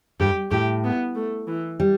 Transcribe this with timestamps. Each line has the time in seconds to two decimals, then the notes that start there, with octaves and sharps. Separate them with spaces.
0.20 G2 G4
0.51 A2 G4
0.84 B3
1.15 A3
1.48 E3
1.80 G3